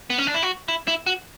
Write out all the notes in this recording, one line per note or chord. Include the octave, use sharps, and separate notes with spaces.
B3
C#4
D4
E4
F#4
E4
E4
F#4